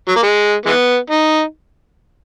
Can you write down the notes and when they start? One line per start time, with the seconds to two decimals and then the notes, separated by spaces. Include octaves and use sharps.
0.08 F#3
0.16 A#3
0.23 G#3
0.66 E3 G#3 B3
1.10 D#4